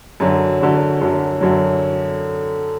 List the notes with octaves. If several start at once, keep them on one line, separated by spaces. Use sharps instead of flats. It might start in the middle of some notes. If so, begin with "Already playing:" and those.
F#2 D3 F#3
F#2 D3 F#3
F#2 D3 F#3
F#2 D3 F#3